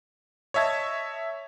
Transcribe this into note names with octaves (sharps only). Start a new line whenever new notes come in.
C#5 D#5 E5 A5 G#6